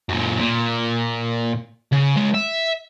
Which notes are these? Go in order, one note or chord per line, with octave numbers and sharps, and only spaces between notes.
F#2 A#2
A#2
C#3
C#2 G#3
E5